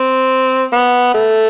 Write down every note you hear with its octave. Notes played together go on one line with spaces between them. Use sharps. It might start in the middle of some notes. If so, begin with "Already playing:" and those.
Already playing: C4
B3
A3